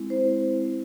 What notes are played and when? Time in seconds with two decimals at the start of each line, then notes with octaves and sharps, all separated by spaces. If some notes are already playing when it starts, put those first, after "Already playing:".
Already playing: G#3 C4 E4
0.10 C5